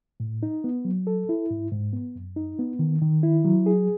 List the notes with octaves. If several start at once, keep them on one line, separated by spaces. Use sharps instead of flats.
A2
D#4
B3
F#3
A4
E4
G#2
G#2
B3
F#2
D#4
B3
D#3
D#3
E4
F#3
G#4